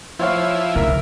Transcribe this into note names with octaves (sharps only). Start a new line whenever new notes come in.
F3 E4 C5 C#5 F5
C#3 A#4 E5